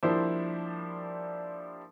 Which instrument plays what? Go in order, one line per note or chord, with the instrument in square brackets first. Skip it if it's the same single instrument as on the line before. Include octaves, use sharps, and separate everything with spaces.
[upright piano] F3 G3 A#3 D4 E4 C5